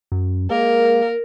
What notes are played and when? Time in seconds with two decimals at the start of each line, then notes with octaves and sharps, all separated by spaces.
0.12 F#2
0.51 G#3 A#3 A#4